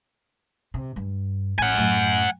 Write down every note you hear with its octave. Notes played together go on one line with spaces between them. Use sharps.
C3
G2
A1 F#5 G#5
F#2 A2